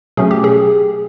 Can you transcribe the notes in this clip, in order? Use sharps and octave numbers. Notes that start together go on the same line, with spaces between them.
B2 F#3 A3 C#4 G#4
G4
G#4